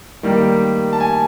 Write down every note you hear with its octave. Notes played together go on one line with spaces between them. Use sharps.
D#3 G3 A#3
A5
G#5